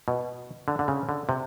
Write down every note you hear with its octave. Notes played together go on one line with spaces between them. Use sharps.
B2
D3
D3
C#3
D3
C3